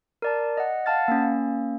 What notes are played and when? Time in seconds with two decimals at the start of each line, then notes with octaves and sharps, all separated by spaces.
0.22 A#4 D5 A5
0.57 D#5 F#5
0.86 F5 F#5 A5 F6 A6
1.08 A#3 C#4